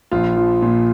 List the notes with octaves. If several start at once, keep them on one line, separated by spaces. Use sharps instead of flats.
A#1 F4
F3
A#2